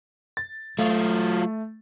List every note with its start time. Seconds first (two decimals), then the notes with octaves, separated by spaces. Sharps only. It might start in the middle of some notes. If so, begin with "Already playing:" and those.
0.37 A6
0.78 F#3 A3 F4